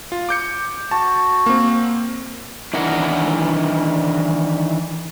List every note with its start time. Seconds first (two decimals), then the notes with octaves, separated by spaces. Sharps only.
0.12 F4
0.29 D6 G6 C#7
0.91 F#4 A5
1.46 A#3 C4
2.73 D#3 E3 D4 E4 A#4 F#5